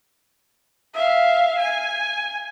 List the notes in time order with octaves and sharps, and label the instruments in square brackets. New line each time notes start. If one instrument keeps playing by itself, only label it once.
[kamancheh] E5 F5
G#5